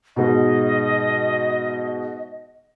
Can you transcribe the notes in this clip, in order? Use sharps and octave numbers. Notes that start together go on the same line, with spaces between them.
G#2 B2 D#5